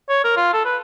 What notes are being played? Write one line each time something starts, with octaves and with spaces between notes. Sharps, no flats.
C#5
A#4
F4
A4
B4